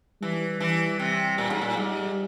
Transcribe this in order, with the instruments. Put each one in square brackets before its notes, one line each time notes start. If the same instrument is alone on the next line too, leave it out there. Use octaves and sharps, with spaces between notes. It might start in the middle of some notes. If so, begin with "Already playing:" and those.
[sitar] E3 [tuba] G3
[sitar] E3
C3
A#2
G#2
A#2
[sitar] G#2 [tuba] G3